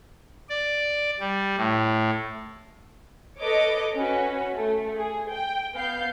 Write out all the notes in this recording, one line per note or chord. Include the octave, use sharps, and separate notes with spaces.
D5
G3
A2
A4 B4 C#5 D#5 D6
C#4 F#4 B4
A3
G#4
G5
B3 F5 G6 C7